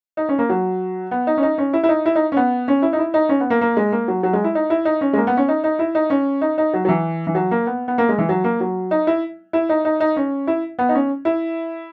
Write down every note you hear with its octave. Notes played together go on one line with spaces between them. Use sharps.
D#4
C#4
A#3
F#3
B3
D#4
C#4
D#4
C#4
E4
E4
D#4
E4
D#4
C#4
B3
C#4
E4
D#4
E4
D#4
C#4
B3
A#3
A#3
G#3
A#3
F#3
F#3
G#3
E4
D#4
E4
D#4
C#4
G#3
A#3
B3
C#4
D#4
D#4
E4
D#4
C#4
D#4
D#4
F#3
F#3
E3
E3
F#3
A#3
B3
B3
A#3
G#3
E3
F#3
A#3
F#3
D#4
E4
E4
D#4
D#4
D#4
C#4
E4
B3
D#4
C#4
E4